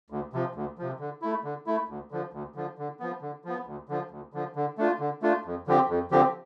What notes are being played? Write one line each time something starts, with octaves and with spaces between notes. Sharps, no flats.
D2
C3 F3
D2
C3 F3
D3
A3 E4
D3
A3 E4
D2
D3 F3
D2
D3 F3
D3
F3 B3
D3
F3 B3
D2
D3 F3
D2
D3 F3
D3
A3 D4 F4
D3
A3 D4 F4
F2
D3 F3 C4 G4
F2
D3 F3 C4 G4